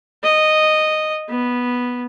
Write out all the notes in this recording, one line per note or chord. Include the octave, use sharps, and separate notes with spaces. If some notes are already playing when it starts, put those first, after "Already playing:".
D#5
B3